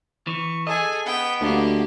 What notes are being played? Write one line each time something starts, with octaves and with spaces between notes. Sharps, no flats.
E3 C#6
G#4 A4 D#5 G#5
B3 G5
D2 A#3 G4